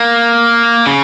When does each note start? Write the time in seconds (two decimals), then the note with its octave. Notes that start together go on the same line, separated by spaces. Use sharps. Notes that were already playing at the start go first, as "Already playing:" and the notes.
Already playing: A#3
0.87 C#3